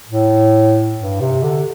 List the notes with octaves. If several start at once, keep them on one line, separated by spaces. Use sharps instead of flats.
A2
G2
C3
D3